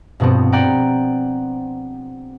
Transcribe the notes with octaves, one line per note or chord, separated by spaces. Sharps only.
G2 B2 F3 B3 C4
D5 F#5 G5 A#5 D6